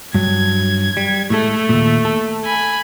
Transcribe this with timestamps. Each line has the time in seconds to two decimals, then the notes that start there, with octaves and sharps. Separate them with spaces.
0.14 G2 F#3 G#6
0.97 G3
1.30 A2 G#3 A3 A4
1.69 D#2 A#2
2.05 A4
2.45 G#5 B5